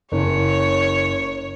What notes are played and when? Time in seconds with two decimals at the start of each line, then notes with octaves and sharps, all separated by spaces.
0.12 F#1 C#5